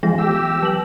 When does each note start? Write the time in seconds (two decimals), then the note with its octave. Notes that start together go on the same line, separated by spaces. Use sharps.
0.03 E3 F3 G#3 B3 A#6
0.18 G4 E6
0.62 F#3 F#7